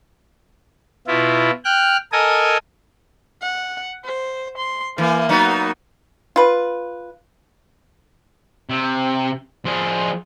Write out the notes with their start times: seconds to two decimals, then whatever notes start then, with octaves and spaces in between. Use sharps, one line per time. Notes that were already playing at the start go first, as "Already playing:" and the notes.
1.07 B2 E4 F4
1.65 G5 F6 F#6
2.12 A4 A#4 D#5 G#5 D#6
3.42 F#5
4.05 C5
4.58 C6
4.98 E3 A#3
5.29 F#3 B3 D#4
6.36 F4 B4
8.70 C3
9.65 F3 G#4